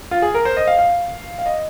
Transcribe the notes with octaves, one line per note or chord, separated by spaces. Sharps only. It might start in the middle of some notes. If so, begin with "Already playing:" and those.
F4
G#4
A#4
C5
D#5
F5
F5
F5
D#5